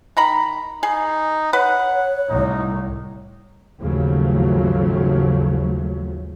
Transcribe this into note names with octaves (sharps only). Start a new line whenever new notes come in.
D#3 A#5 B5
D#4 G#4
B4 C#5 F#5
C2 A2 D#4
G#1 D#2 C#3 F3 F#3 A3